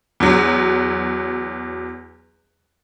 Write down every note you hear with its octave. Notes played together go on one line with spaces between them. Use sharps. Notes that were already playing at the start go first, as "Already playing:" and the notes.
E2 F#3